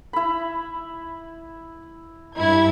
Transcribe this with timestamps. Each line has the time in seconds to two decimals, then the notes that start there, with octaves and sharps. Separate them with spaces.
0.13 E4 B5
2.38 G2 E4 G#6